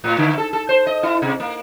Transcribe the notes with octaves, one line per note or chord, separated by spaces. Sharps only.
A2
D3
A4
A4
C5
D#5
E4
C3
A#3